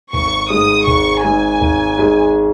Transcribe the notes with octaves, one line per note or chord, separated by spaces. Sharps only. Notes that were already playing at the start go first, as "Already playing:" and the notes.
G#1 C#6
G#2 G#3 D#6
G#1 C#6
G#2 G#3 G#5
G#1
G#2 G#3